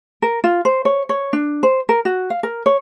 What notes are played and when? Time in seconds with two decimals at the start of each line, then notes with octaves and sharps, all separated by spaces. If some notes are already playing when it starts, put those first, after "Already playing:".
0.22 A#4
0.44 F4
0.65 C5
0.85 C#5
1.09 C#5
1.33 D4
1.63 C5
1.89 A#4
2.05 F#4
2.30 F5
2.43 A#4
2.66 C#5